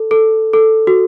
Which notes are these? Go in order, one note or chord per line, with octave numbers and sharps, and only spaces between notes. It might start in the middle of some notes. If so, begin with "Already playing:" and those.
Already playing: A4
A4
A4
F#4